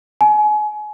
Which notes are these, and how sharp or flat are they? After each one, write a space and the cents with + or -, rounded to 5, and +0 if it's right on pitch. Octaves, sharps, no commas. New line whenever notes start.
G#5 +30